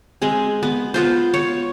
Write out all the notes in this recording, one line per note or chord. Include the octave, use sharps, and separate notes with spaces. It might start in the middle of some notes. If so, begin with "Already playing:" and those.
G#3 C4 G#4
B3
B3 F4 C5
C#5